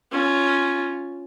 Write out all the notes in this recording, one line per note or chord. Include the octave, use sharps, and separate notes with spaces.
C#4 F4